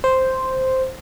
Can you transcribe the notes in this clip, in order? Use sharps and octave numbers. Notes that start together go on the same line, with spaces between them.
C5